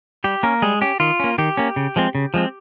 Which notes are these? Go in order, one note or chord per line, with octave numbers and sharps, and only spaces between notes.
G3 G4
A#3 C#4 A#4
G3 G#3 G#4
C#4 G4
D#3 F4
A#3 C#4
D#3 G4
A#3 C#4
C#3
F3 G#3 C4
C#3
F3 G#3 C4